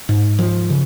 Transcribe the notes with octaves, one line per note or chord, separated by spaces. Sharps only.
G#2
F3
C#3